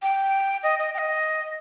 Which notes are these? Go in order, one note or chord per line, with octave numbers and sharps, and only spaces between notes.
G5
D#5
D#5
G5
D#5